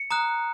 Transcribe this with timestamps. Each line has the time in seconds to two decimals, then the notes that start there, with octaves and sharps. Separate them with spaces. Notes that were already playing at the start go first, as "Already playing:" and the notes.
Already playing: C#7
0.11 A#5 D#6 F#6